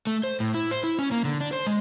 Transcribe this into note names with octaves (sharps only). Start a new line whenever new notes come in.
A3
C5
A2
E4
C5
E4
C#4
A#3
D3
D4
C5
G#3